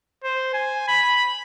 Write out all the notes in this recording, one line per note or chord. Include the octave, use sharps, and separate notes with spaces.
C5
G#5
B5